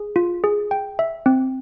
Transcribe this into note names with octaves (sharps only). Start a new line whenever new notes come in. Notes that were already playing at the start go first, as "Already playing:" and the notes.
Already playing: G#4
F4
G#4
G5
E5
C4